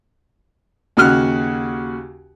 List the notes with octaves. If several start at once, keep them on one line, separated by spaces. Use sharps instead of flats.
D#2 C#3 F#4 F6 F#6